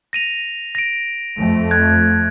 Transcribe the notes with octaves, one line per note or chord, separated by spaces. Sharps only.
A#6 D#7 F7
A#6 D7
F2 A3
F#6 G#6